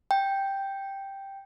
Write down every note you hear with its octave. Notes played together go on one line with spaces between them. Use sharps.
G5